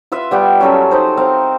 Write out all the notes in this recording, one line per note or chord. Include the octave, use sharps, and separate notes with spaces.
F4 B4 E5 F5
G3 B3 D5 G5
F#3 C#4 A4 A#4
D#4 C5
C4 F5 A#5